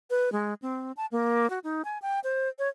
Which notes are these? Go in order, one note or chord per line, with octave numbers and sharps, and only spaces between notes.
B4
G#3
C4
A5
A#3
F#4
D#4
G#5
G5
C5
C#5